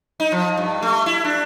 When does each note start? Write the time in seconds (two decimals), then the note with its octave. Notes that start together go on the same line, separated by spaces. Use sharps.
0.20 D#4
0.32 F3
0.57 G2
0.82 A3
1.06 E4
1.25 D4